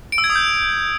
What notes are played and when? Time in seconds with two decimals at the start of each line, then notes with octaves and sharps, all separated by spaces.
0.12 D7
0.18 E6
0.24 G#6
0.30 D#6
0.35 G6